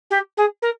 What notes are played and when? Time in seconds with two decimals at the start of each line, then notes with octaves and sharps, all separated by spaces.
0.10 G4
0.37 G#4
0.62 A#4